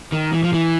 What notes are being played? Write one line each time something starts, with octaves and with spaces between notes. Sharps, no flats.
D#3
E3
F3
E3